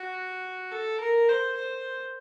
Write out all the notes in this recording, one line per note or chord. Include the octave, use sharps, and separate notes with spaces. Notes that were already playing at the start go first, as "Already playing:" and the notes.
Already playing: F#4
A4
A#4
C5
C5